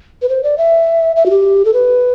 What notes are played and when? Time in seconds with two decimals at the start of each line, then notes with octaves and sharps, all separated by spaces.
0.22 B4
0.29 C5
0.43 D5
0.58 E5
1.16 E5
1.26 F#4
1.30 G4
1.65 A4
1.73 B4